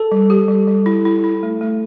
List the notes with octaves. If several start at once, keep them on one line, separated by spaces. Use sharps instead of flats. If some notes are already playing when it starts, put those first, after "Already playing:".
Already playing: A4
G3
G4
G3
G3
E4
E4
E4
A3
A3